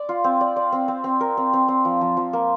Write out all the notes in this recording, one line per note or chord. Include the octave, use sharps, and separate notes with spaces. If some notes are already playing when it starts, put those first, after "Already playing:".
Already playing: D5
F4
C4
D5
D5
C4
C4
C4
A#4
C4
C4
C4
F3
F3
F3
A#3